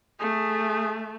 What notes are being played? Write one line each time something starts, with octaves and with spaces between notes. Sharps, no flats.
A3 G#4